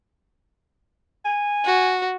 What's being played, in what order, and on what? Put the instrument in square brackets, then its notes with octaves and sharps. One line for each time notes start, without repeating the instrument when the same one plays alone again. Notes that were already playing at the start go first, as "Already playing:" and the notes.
[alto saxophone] G#5
[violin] F#4